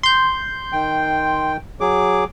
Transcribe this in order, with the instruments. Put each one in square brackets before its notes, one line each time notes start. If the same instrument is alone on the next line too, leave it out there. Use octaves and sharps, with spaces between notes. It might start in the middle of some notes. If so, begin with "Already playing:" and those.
[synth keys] C6 G6
[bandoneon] D#3 G5
F#3 G#4 D6